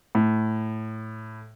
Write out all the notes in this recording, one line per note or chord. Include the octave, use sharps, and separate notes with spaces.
A2